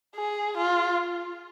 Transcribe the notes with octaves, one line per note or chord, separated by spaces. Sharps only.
G#4
F4